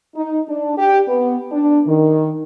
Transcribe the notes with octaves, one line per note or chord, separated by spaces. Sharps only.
D#4
D4
G4
B3
D4
D#3